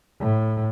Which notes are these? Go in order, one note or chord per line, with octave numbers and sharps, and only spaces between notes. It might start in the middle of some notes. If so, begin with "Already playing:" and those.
A2